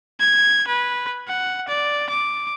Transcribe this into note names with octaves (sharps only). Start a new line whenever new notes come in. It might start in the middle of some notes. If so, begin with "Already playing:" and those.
G#6
B4
F#5
D5
D6